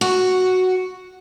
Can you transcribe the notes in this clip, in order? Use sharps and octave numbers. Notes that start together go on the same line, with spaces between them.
F#4